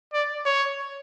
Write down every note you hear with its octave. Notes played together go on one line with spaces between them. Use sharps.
D5
C#5